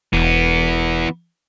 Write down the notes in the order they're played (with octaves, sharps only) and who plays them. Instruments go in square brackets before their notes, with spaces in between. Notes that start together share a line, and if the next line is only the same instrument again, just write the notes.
[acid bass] E1 [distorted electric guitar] E3 B3